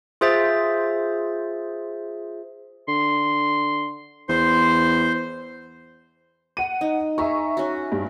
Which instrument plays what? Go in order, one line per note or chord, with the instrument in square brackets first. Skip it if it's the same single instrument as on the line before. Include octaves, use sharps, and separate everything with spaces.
[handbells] F4 G#4 C5 E5 A6
[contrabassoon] D3 [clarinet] C6
[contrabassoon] E2 [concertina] C5 [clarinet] C6
[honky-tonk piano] F#5 D#7
[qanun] D#4
[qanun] G#4 [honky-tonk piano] E5 A#5 C#6
[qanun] C#4 F#4
[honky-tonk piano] G2